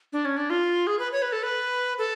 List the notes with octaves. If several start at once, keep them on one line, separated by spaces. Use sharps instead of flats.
D4
C#4
D4
F4
G#4
B4
C#5
B4
A4
B4
A4